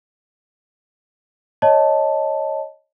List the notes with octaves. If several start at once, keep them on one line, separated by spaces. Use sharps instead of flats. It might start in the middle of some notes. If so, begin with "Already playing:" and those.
C#5 D#5 A5